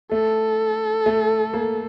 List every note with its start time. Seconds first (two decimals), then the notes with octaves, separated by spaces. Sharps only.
0.12 A3 A4
1.06 A3
1.54 A#3